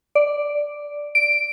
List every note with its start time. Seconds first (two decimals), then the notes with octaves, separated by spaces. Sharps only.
0.15 D5
1.15 D7